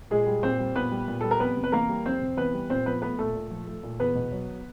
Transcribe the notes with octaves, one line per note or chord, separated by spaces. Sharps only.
A#2 G#3 G#4
G3
A#2 C4 C5
G3
A#2 B3 B4
G3
A#2
G3 A4
A#4
F2 B3 B4
C3
B4
E3 A#3 A#4
G3
F2 C4 C5
C3
E3 B3 B4
G3
A#2 C4 C5
F3 B3 B4
A3 B3 B4
A#2 A3 A4
A#2
F3
A3
A#2
E2 B3 B4
B2
F#3